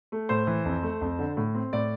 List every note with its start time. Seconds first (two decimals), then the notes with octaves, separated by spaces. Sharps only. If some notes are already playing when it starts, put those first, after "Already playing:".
0.12 A3
0.29 A2 C5
0.47 E3
0.65 F2
0.83 A3
1.01 F2
1.19 D3
1.37 A2
1.55 C4
1.73 A2 D5